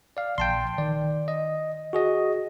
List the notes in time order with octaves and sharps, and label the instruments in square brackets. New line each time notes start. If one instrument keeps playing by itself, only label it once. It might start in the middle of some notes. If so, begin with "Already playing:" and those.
[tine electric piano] D5 F5
[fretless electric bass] A#1 [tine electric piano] G5 A5 C6
[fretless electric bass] D#3 [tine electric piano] D5
[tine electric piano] D#5
F#4 G#4 D#5